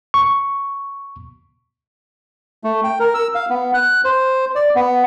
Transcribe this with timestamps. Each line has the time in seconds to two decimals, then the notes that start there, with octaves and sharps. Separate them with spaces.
0.14 C#6
2.64 A3
2.84 G5
3.00 A#4
3.14 E6
3.35 F5
3.50 B3
3.74 F#6
4.05 C5
4.55 D5
4.75 B3